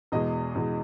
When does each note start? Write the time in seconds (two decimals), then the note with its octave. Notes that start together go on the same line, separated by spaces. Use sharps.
0.12 E2 B2 G#3 D#5
0.55 E2 B2 G#3